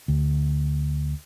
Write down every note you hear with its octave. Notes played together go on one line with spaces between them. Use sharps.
D2